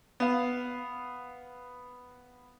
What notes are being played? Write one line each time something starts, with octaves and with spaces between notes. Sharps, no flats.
B3 F5